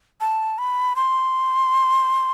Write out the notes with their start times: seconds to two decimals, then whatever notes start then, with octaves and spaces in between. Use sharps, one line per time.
0.21 A5
0.58 B5
0.96 C6